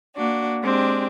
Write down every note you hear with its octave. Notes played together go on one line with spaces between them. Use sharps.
A#3 D4 F#4
G#3 C4 D4 G4